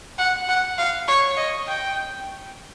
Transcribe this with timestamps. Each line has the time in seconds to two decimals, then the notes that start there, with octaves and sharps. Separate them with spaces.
0.18 F#5
0.49 F#5
0.78 F5
1.08 C#5
1.37 D#5
1.68 G5